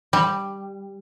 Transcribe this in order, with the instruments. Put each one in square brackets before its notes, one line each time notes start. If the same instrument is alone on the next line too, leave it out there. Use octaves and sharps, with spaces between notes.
[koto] G3